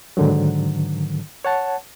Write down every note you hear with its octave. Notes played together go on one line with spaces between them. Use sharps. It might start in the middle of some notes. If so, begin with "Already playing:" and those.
G#2 D3 D#3 F#3
C#5 F#5 A5